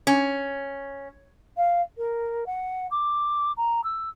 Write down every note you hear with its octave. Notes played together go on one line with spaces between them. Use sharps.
C#4
F5
A#4
F#5
D6
A#5
E6